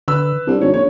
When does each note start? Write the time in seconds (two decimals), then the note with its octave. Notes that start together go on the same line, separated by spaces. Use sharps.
0.08 D3 B4 E6
0.47 C2 D4
0.61 G#1 C#5
0.74 A#1 C#5